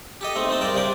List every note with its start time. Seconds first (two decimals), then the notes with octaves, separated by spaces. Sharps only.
0.21 G4 A4 D#5
0.35 A3 C4 D#4
0.49 C4 D#4 A5
0.60 G2 C4 A#4 D5 A5
0.75 C3 D4 D5 G5 D6